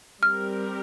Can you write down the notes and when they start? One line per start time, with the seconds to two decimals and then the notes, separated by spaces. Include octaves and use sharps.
0.23 G3 C4 G4 A#4 F6